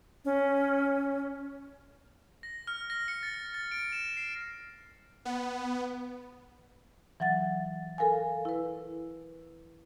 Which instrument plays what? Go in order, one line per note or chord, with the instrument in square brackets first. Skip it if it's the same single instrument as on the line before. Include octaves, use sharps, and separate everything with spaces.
[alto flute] C#4
[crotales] A#6
F6
A#6
C#7
A6
A6
A6
D7
E7
C7
[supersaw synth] B3
[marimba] E3 F#3 F#5 A6
A4 A#4 F5 G#5
E4 B4